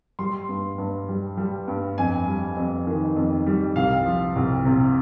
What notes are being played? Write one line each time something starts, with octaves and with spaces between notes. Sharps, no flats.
G3 C6
G2
G2
G3
G3
G2
F2 G#5
G3
F2
D#3
F2
G3
C2 F5
F3
C2
C3